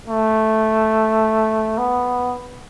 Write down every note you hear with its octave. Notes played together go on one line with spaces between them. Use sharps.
A3
B3